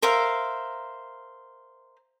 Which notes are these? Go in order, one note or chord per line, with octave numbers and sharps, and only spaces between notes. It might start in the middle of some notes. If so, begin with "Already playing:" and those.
A#4 C5 E5 F5